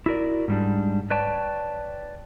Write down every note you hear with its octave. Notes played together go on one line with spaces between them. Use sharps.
E4 F#4 A#4 D5
G#2 G3 D4
B4 C#5 D5 G5 A5